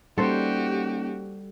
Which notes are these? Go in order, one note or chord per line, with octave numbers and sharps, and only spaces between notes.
G3 A#3 C#4 D#4 F#4 G4 A4 C5